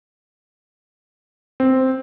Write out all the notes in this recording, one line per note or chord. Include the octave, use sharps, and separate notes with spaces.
C4